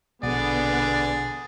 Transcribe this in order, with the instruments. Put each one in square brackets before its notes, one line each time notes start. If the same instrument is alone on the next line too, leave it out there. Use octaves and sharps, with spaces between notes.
[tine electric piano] A#1 B2 F#5 [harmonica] D3 G#4 [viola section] B3 [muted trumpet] D5